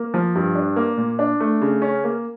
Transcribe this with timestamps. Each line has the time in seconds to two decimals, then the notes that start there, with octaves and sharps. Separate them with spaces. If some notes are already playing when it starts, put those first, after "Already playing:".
Already playing: A#3
0.14 F3
0.35 G2
0.55 D4
0.76 A#3
0.97 A#2
1.19 D4
1.40 A3
1.61 C#3
1.82 C#4
2.04 A#3